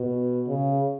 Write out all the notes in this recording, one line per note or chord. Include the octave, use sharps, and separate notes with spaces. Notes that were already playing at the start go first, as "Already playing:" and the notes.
Already playing: B2
C#3